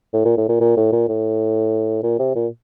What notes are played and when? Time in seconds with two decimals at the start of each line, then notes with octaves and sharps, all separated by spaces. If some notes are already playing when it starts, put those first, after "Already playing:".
0.14 A2
0.25 A#2
0.37 A2
0.49 A#2
0.60 A#2
0.77 A2
0.92 A#2
1.08 A2
2.03 A#2
2.19 C3
2.35 A#2